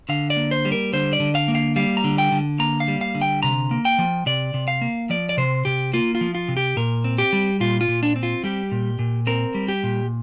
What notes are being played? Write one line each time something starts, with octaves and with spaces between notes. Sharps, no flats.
D3 F5
D5
A#3
C5
G3
A#4
D3 C5
D5
D3
F5
A#3
F5
G3 F5
A#5
D3
G5
D3
A#3 A#5
F5
G3
F5
D3
G5
C3 A#5
A#3
G5
F3
C3 D5
C3
F5
A#3
F3 D5
D5
C3 C5
C3 G4
A#3 F4
F4
F3
F4
C3
G4
A#2 A#4
C4
G4
G3
A#2 F4
F4
A#2
D4
C4
F4
G3 G4
A#2
A#2
C4 A#4
G3
G4
A#2